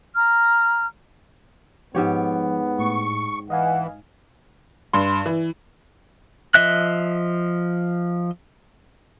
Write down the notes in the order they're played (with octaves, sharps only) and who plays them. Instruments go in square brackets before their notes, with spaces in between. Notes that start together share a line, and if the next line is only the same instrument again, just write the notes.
[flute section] A#5 F6
[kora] G#2 G4 C#5 [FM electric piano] F3 [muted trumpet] B3
[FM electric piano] A2 [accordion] C#6
[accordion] E3 [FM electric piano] D#5 F5 G#5 [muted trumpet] F#5
[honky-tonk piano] G2 B5 C6
E3
[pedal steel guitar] F3 D#5 E5 F#6